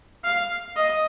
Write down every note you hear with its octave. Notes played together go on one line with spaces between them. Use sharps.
F5
D#5